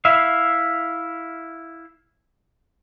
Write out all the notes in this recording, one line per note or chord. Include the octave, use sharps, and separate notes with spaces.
E4 E5 F5